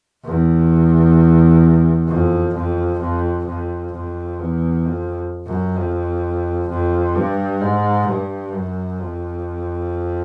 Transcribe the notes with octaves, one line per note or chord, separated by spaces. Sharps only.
E2
F2
F2
F2
F2
F2
E2
F2
F#2
F2
F2
G2
G#2
G2
F#2
F2